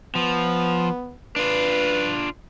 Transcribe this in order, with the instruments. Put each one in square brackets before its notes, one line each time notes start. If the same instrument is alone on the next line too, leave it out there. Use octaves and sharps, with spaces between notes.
[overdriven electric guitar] F3 [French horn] B3
[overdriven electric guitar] D4 F4 [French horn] B4